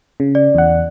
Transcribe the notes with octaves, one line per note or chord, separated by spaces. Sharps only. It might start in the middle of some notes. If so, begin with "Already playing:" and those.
C#3
D5
E2 F#5